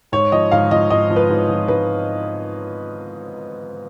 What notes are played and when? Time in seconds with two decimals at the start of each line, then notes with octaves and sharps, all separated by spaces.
0.12 G#2 C#5
0.32 F3 D#5
0.51 G#2 F5
0.71 F3 D#5
0.90 G#2 D#5
1.10 F3
1.16 B4
1.30 G#2
1.49 F3
1.68 G#2 B4